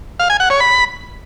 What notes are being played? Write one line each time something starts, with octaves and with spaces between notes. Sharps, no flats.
F5
G#5
F#5
C#5
B5